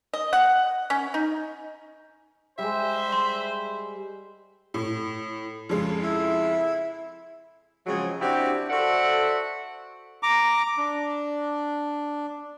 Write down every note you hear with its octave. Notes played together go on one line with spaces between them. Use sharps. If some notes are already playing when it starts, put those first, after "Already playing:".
D#5
F#5
C#4
D#4
G3 G#3 C5 E5
C6
A2
F2 C#3 G#3
E4
C#3 F3 F#3 G#3 C4 G#4
C4 D4 E4 F#4 G4
F#4 A4 C5 D5 E5 F#5
A#5 D6
D4